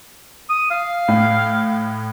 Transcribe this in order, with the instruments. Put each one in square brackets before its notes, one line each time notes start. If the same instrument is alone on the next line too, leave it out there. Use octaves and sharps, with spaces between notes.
[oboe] D#6
F5
[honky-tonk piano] A2